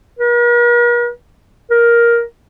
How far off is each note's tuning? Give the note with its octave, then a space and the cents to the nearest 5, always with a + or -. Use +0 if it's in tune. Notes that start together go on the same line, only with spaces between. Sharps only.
A#4 +45
A#4 +10